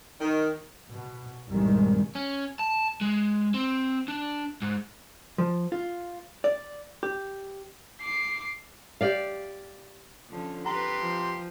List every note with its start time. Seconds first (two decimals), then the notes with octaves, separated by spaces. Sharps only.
0.21 D#3
0.91 B2
1.49 C2 G2 A#2 D#3 G3 G#3
2.15 C#4
2.59 A5
3.01 G#3
3.54 C4
4.08 D4
4.62 G#2
5.38 F3
5.72 F4
6.44 D5
7.03 G4
8.01 D6 C7
9.01 G4 D5 F5
10.29 D3 F3 C#4
10.66 G4 B4 A#5 C6
10.99 F3